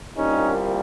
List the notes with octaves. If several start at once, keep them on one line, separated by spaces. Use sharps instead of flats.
C2 A#2 G3 A#3 C#4 D#4